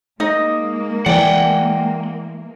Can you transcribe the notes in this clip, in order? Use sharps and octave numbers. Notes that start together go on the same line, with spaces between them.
G#3 A#3 D#4 D#5
E3 D5 F#5 G5